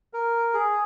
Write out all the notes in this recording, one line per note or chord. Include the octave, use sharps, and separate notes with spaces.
A#4
G#4